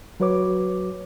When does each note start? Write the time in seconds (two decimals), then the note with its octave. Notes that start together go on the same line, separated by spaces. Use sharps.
0.20 F#3 F#4 B4 C#5 D6